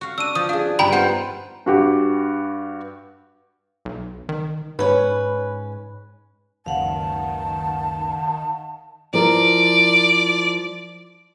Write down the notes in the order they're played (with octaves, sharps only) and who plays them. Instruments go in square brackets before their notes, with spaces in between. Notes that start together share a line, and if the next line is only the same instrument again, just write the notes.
[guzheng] F#4 F5
[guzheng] D4 [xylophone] E6 D#7
[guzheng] F3 [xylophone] D#6
[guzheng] D4 G#4 [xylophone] F5
[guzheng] G2 D#4 B4 [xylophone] G5 A#5 B5
[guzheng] B3 F4 C5 [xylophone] F#5
[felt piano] G2 F#4 G4
[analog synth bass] B1
D#3
[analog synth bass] G#2 [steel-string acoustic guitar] C#4 B4
[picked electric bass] F#1 C#2 [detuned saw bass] D#3 [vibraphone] F5 F#5 [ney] A5
[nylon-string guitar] F3 E4 A#4 [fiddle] D5